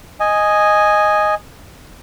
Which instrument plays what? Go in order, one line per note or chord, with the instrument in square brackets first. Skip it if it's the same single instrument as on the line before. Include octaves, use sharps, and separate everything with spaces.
[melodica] D#5 G#5